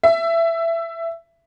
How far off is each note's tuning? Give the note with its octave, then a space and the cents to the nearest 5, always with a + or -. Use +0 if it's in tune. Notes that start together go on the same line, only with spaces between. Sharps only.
E5 +15